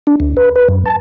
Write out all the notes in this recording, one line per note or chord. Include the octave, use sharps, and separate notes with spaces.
D4
D2
B4
B4
F#2
A5